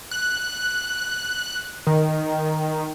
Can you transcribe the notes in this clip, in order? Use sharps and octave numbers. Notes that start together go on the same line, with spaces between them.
F#6
D#3